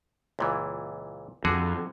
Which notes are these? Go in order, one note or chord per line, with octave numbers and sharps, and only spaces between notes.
C#2 A#2 E3
F2 D3 F#4 G#4